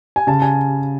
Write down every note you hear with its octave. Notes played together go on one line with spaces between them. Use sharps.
G#5
C#3 A5
G#5